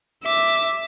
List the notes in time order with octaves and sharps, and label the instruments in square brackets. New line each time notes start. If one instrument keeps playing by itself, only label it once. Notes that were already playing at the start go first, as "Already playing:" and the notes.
[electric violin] E5 D6